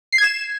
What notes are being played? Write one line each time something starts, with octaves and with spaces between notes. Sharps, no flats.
C7
G#6
E7